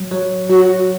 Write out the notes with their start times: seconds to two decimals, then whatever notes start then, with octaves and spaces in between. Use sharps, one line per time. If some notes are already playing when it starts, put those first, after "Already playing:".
Already playing: F#3
0.11 F#3
0.49 F#3 F#4